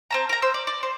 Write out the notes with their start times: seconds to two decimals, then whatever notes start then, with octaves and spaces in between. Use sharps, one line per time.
0.10 C4 A5 A#5
0.29 A#4 A#5
0.42 C5 E6
0.54 D5
0.67 D5
0.83 C5